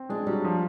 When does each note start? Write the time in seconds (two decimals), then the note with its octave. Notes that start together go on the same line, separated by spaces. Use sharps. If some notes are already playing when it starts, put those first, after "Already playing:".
Already playing: C4
0.09 G#3 D4
0.27 F#3 G3
0.44 F3